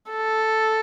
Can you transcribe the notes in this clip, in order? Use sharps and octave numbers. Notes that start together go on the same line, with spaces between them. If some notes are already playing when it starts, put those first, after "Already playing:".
A4